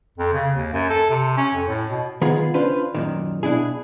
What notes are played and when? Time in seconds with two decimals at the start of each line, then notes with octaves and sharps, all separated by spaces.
0.18 F2
0.33 C#3
0.53 D#2
0.73 F#2
0.89 A4
1.10 C3
1.37 C#4
1.54 F2
1.68 A2
1.90 B2
2.21 D#3 B3 F4 G#4
2.54 C#4 D4 F4 B4 C5
2.95 F#2 A#2 D#3
3.43 B2 D4 E4 G#4